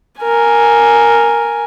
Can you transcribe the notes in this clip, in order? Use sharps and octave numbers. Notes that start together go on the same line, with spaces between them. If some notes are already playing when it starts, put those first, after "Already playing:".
A#4 G#5